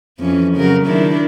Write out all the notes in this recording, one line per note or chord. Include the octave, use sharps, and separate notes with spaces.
F2 E3 C#4
C#3 F#3 A#4
D#3 D4 E4